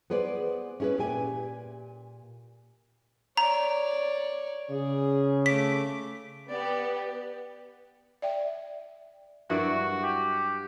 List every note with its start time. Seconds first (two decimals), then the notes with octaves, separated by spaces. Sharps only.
0.10 B3 G#4 B4 C5 D5
0.80 C#4 E4 G#4 A4 B4
0.98 A#2 G4 G#5
3.37 C#5 D5 A#5
4.70 C#3 G#4
5.46 A3 D6 B6
6.49 B3 G4 D5
8.22 D5 E5 G5
9.50 G2 F#3 E4 F#4 A#4 D5 E5
10.03 G4